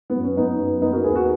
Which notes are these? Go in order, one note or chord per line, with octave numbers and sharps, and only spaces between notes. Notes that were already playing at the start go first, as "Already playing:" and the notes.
B3
F#2
C#4
F#2 B3 D#4
F#2
A#3 B3 D#4
F#4 A#4
D#2 G#4 B4
F#4 A#4